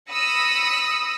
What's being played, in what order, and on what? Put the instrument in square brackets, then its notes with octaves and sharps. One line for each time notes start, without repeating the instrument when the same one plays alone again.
[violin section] B5 D#6 E6 A#6 C#7